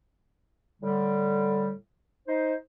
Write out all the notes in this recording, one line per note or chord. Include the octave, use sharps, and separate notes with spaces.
A2 D3 G3
D#4 C5